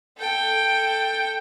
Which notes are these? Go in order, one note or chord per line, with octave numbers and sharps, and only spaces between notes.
A4 G5